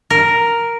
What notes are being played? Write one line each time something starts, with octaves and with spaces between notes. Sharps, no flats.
A#4